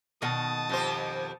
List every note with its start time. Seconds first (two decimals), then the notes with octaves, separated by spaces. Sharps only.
0.22 B2 D#3 A5 D#6
0.69 F2 G4 C5